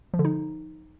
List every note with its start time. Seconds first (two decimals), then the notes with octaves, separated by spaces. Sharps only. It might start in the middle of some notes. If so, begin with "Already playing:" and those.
0.14 F3
0.19 D3
0.25 D#4